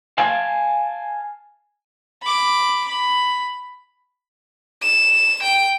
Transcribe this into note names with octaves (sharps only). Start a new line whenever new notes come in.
F5 G#5 A5
B5 D6
B5
E7
G5